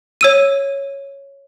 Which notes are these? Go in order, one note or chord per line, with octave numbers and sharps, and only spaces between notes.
C#5 E6 D#7